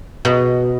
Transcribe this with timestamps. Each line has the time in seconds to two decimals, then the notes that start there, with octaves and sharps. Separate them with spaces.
0.25 B2